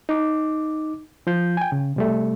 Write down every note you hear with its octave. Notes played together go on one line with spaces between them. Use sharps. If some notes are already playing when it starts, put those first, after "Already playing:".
D#4 D6
F3 F4 G6
G5 G#5
C#3
C3 G3 A3